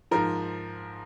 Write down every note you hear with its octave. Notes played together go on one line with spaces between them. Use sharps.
G#2 F3 A#4